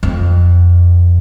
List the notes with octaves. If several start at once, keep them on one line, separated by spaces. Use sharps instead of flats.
F2